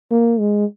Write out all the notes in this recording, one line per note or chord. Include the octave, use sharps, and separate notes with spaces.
A#3
G#3